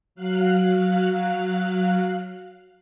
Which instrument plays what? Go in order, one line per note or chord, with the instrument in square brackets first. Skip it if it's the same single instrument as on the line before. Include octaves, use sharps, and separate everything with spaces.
[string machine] F#3 F5 F#6